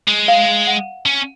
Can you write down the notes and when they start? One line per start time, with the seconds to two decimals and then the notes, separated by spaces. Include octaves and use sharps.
0.08 G#3
0.28 F5
0.67 F#5
1.06 C#4